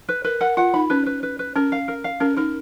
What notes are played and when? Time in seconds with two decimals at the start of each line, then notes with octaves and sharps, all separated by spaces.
0.09 B4
0.24 A#4 B4
0.41 A#4 F#5
0.57 F4 F#5
0.74 D#4 B5
0.90 C#4 B4
1.06 B4
1.23 B4
1.39 B4
1.56 C#4 A#4
1.72 F5
1.88 A#4
2.04 F5
2.20 C#4 A#4
2.37 D#4 A#4